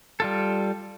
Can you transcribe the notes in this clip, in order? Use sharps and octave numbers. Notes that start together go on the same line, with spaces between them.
G3 F4 A4